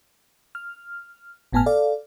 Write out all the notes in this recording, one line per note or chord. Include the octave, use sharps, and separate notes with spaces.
F6
G1 A2 B3 G#5 A5 F6
A4 D5 F5